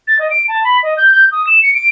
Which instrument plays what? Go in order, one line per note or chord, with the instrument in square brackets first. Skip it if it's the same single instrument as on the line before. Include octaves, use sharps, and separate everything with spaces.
[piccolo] A6
D#5
D7
A5
B5
D#5
G6
G6
D#6
E7
C#7
D7